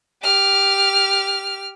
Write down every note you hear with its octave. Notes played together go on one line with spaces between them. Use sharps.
G4 F6